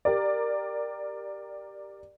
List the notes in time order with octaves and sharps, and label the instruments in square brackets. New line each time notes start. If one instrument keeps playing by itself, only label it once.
[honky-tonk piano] G4 A#4 D5